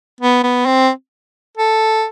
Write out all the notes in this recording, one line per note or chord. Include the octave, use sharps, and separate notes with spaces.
B3
B3
C4
A4